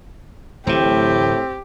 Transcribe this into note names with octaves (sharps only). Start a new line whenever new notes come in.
D1 A2 E3 C4 G4